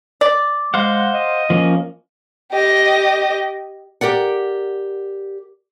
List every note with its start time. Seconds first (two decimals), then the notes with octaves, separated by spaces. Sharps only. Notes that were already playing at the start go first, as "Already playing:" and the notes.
0.21 D5
0.74 G#3 C5 F5 F#5
1.14 D#5
1.50 F3 A#3 C#4
2.51 G4 D#5
4.01 G4 A#4 D5 F#5